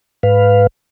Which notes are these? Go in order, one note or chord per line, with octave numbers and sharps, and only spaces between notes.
G#2 B4 F5